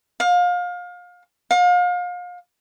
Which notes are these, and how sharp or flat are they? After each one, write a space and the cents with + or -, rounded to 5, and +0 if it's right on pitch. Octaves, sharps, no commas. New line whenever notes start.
F5 +30
F5 +35